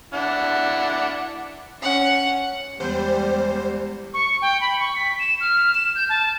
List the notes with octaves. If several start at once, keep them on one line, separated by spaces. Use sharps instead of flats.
D4 E4 F#5
C#4 F#5
E2 G3 G#3 B3 G4 C5 G6
C#6
G5
B5
C#6
B6
E7
F6
E7
G6
A5